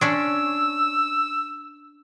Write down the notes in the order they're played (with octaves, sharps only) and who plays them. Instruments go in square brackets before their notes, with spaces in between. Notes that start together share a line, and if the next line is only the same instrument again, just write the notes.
[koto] C#4 D4 [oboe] E6